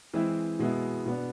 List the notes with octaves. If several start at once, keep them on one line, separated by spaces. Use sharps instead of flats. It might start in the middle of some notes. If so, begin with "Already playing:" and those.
E3 G#3 C4 E4
B2 G#3 B3 E4
B2 B3 D4